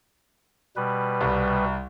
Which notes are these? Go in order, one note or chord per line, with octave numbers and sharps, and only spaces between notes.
B2 G3 B4
C2